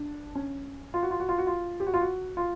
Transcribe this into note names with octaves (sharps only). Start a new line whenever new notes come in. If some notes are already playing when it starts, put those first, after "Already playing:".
Already playing: D4
C#4
F4
F#4
F4
F#4
F4
F#4
F4
G4
F#4
F4
F#4
F4